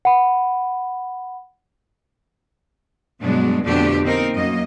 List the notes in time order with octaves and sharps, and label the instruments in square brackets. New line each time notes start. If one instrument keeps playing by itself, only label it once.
[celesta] F#5 B5
[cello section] G2 B2 F#3 G#3 D4
F2 B2 D3 A3 D4 G4
A#3 C4 D#4 A#4
F#2 A#3 D#5